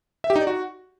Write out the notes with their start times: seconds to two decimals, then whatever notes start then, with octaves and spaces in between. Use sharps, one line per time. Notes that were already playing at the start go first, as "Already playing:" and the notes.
0.24 E5
0.30 G4
0.36 D#4
0.41 D5
0.47 F#4